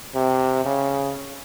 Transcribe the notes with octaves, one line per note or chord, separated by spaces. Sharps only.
C3
C#3